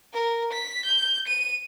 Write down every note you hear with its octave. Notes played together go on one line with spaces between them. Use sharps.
A#4
B6
G6
D#7